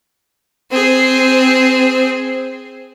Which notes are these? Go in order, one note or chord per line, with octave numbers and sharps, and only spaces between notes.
C4 G#4